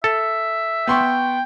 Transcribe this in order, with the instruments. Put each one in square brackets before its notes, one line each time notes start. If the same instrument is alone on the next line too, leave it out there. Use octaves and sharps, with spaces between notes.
[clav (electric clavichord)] A4 [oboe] E5
[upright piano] B3 C6 C#6 [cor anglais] G5